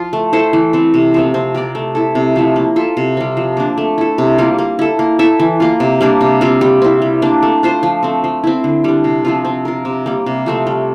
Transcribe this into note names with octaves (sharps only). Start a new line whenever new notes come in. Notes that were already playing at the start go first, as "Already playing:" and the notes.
Already playing: F3 F4
A3
E4 A4 C5
E3
A3 C4
C3
F3 A3 C4
C4
G4 A#4 D5
A3
E4 A4
C3
F3 A3 E4
A#3
F4 A4 E5
C3
G3 C4
F3
A#3 D4
A3
E4 A4
C3
G3 A#3 F4
A#3
E4 A4
A#3
E4 A4 E5
E3
A#3 F4
C3
G3 A#3 D4
C3
G3 C4 F4
G3
C4 E4
G3
A#3 D4
A3
D4 F4 C5
F3
A3 C4
F3
C4 E4
D3
G3 D4
C3
F3 C4 F4
C4
F4 A#4
C3
G3 A#3
C3
F3 A3 C4
G3